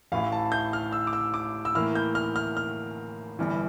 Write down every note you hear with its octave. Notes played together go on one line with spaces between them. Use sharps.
A1 A2 E3 F5
A5
G6
F6
E6
D6
E6
D6
E6
A2 E3 A#3 F6
G6
F6
F6
F6
G1 G2 E3